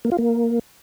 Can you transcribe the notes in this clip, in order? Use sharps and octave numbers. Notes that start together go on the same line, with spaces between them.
A#3
F4
A#3